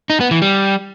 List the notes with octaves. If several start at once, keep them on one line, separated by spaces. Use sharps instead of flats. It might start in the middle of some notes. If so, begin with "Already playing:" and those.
D#4
B3
E3
G3